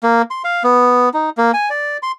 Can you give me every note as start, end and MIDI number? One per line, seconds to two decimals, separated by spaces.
0.03 0.22 58
0.31 0.42 84
0.44 0.63 77
0.64 1.09 59
1.14 1.30 63
1.38 1.52 58
1.54 1.69 80
1.70 1.97 74
2.03 2.12 84